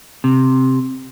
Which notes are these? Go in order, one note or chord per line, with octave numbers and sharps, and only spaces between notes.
C3